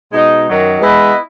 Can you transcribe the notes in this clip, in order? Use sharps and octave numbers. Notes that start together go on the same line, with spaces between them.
B2 G#3 D#4
F#2 D#3 F#3
G#3 B3 E4 B4 D#5